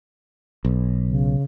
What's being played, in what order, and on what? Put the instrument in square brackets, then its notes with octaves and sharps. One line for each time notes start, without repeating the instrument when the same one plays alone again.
[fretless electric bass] B1
[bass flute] C#3